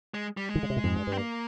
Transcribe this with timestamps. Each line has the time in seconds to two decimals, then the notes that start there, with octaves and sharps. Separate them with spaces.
0.14 G#3
0.37 G3
0.49 G#3
0.55 D#3
0.63 C#3
0.70 C3
0.76 A#2
0.84 F2 G#2
0.96 G2
1.07 G2 C4
1.18 A#3